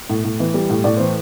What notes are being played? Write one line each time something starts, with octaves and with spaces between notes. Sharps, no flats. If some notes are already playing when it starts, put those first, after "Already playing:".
A2
A2
E3
G3
A2
A2 D5
E3 C5